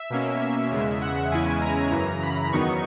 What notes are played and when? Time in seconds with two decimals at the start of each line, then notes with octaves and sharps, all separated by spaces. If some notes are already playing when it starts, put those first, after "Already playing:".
Already playing: E5
0.10 B2 A#3 C#4
0.41 E5
0.71 E2 C#3 G#3
1.01 F#5
1.31 E2 C#3 G#3 C#4 E4 G#5
1.61 A#5
1.92 F#2 C#3 E3
2.22 B5
2.52 E2 D#3 F#3 B3 D#4 C#6